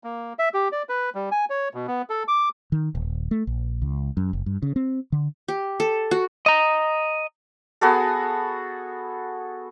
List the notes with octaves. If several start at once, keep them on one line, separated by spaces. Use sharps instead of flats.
A#3
E5
G4
D5
B4
G3
G#5
C#5
B2
B3
A4
D6
D#3
D#1
A3
A#1
C#2
F#2
F#1
G2
C#3
C4
D3
G4
A4
F#4
D#5 A#5
B3 F#4 G#4 A4